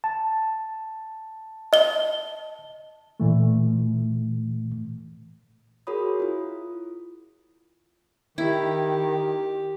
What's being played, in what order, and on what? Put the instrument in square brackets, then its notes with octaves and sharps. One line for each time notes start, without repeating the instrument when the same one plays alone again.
[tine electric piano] A5
[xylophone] D#5 G7
[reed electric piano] A#2 E3 A3
[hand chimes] F#4 G#4 A#4 C#5 B5 D#6
E4 F4
[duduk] D#3 [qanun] E4 [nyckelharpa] G4